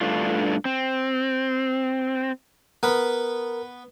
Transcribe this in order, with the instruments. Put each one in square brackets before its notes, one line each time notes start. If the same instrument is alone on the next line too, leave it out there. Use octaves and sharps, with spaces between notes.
[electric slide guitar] G2 A3 D4 F4
C4
[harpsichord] B3 B4 [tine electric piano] A#4